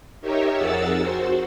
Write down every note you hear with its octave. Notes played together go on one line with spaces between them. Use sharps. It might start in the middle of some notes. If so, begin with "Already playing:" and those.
D#4 G4 A#4 C#5 E5
F2 G#4 A#4 F#5 E6 A6
F#4 C5